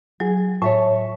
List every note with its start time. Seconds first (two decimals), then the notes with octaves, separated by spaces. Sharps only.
0.20 F#3 G#4
0.62 A2 C#5 E5 A5